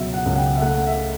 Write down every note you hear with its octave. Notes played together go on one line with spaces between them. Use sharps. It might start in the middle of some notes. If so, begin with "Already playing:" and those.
Already playing: C#2 B2 F#3 E5
F#5
C#2
F#5
G5
E5
A3 F#5
E5